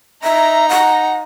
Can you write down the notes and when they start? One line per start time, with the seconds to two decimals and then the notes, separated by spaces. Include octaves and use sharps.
0.23 D#4 E5 A#5
0.69 F#5